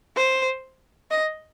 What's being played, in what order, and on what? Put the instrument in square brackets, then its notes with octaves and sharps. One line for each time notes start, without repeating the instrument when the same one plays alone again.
[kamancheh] C5
D#5